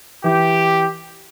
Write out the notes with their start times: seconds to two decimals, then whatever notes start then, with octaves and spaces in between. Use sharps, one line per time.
0.24 E3 G4